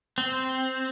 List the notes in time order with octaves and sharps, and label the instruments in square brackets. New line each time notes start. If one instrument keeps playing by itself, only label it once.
[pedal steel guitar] C4